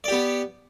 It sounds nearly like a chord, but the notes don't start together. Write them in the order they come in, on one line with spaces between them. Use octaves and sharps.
D5 G4 B3